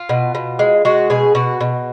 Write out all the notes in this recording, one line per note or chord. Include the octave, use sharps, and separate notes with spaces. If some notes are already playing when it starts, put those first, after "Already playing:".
Already playing: F4
B2
B2
G#3
G#3 F#4
B2 G#4
B2 F#4
B2